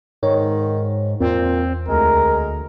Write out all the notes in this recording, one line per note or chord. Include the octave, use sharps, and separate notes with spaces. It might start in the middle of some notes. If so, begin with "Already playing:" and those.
G#2 D#3 C#5
E2 A#2 C4
D2 G#3 A#4